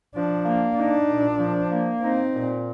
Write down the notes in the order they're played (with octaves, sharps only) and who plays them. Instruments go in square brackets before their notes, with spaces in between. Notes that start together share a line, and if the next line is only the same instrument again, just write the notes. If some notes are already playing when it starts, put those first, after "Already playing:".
[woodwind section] F3 [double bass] D4
[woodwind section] A#3
[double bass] D4 [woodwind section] D#4
[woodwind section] A#2
F3
A#3
[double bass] C4 [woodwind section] D#4
[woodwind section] A#2